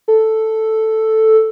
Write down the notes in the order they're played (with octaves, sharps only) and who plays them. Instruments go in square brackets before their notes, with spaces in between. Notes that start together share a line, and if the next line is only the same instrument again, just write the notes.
[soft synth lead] A4